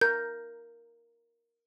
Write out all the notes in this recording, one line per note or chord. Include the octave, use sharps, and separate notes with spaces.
A#4 G6